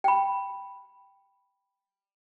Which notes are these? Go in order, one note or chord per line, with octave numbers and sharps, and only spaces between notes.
G5 B5